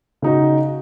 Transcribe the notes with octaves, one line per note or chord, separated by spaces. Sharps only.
C#3 D#4 F#4